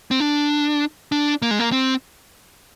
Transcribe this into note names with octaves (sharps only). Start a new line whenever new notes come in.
C4
D4
D4
A#3
G#3
A#3
C4